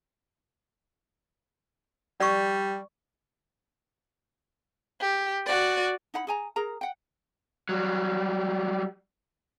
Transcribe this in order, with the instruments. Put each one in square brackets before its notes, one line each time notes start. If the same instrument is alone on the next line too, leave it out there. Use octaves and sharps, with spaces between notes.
[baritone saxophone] G3 [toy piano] D5 C#6
[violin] G4
F#4 D5
[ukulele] D#4 E4 F#5 B5
G#4 G#5 A#5
G#4 A#4 A#5
F#5 G5
[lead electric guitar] F#3 G3